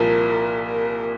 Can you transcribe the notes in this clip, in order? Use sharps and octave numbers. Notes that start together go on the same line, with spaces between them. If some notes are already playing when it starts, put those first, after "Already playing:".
Already playing: C2 A#2 F3 A#4
A#4